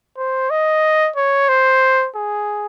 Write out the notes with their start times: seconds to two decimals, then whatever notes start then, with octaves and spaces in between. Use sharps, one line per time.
0.18 C5
0.50 D#5
1.16 C#5
1.49 C5
2.16 G#4